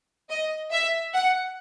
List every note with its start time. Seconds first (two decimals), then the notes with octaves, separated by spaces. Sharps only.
0.29 D#5
0.71 E5
1.13 F#5